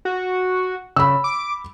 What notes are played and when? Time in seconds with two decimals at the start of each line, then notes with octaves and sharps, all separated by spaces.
0.05 F#4
0.96 C#3 B5 E6
1.24 D6